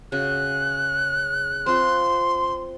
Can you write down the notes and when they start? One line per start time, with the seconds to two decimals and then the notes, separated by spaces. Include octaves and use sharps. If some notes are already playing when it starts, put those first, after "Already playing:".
0.12 C#3 F#4 F#6
1.66 C4 F4 C6